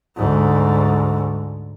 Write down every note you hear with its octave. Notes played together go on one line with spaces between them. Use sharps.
D2 G#2